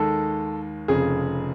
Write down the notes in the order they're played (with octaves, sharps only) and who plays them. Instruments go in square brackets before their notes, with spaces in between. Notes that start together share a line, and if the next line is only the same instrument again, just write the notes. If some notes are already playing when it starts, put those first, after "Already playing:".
Already playing: [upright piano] D#2 D#3 G#3 [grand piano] A4
[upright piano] F1 F2 C#3 [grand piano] G#4